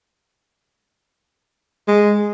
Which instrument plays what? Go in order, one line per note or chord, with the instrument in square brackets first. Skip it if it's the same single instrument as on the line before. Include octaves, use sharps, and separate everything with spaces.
[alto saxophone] G#3